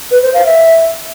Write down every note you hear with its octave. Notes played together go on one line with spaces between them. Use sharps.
B4
C5
F5
E5